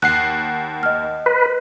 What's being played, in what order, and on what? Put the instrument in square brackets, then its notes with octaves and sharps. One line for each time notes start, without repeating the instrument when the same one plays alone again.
[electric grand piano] D#2 F#5 C7 [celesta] F#6
[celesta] D#5 F6
[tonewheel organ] B4